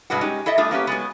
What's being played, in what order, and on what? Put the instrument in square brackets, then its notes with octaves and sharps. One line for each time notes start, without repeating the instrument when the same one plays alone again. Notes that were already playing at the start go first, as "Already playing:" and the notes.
[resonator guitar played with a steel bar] G2 B2 G#3 B3 F#4
G#3 C#4 D#4 G4
E4 A4 D#5 E5
G3 A3 D4 F4 G#4
A#3 B3 C#4 G4
F#3 G#3 B3